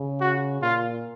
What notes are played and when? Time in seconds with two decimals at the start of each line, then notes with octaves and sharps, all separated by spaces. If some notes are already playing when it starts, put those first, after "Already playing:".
Already playing: C#3
0.21 F#4
0.62 A#2 F4